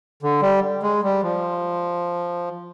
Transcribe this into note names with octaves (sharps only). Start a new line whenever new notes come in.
D3
G3
G#3
G3
F3